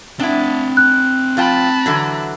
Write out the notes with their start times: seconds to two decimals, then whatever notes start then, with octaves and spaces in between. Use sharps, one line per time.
0.20 C4 D4 E4 F#5
0.77 F#6
1.37 F3 F4 G5 A5 B5
1.86 D3 E3 F#3